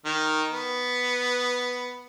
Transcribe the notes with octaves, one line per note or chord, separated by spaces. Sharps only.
D#3
B3